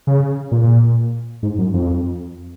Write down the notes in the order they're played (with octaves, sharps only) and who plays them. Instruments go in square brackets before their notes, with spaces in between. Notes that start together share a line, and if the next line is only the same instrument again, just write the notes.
[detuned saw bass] C#3
A#2
G#2
F#2
F2